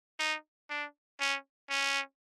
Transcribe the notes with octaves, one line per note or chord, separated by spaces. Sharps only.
D#4
D4
C#4
C#4